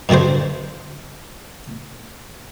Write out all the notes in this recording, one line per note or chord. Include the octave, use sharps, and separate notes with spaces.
G2 B2 D3 G#4 C5